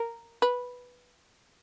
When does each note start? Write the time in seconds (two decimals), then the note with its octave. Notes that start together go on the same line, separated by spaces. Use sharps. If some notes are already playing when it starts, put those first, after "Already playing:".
Already playing: A#4
0.42 B4